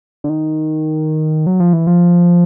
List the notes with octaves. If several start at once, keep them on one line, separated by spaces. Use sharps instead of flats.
D3
D#3
F#3
F3
E3
F3